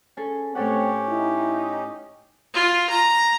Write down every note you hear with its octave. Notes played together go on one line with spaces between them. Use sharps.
C#4 G#4 A4
A2 C4 C#4 G4 A4 C#5 F#5
D#4 E4
F4
A#5